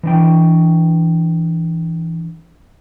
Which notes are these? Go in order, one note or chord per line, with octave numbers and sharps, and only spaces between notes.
E3 D4 G5